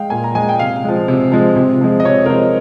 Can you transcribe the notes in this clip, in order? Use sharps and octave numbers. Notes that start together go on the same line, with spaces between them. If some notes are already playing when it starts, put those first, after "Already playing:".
Already playing: G#3 F5 G5
A#2 G#5
A#5
G#3 G#5
G5
C3 F5
F3 G#3
C3
F3 G#3
C3
F3 G#3
D#5
C3 C#5
A#4
F3 G#3 C5